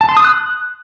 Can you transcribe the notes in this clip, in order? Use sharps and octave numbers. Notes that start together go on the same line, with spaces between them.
A5
C6
D#6
F#6